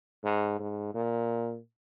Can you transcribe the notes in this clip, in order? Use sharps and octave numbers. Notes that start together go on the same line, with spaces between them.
G#2
G#2
A#2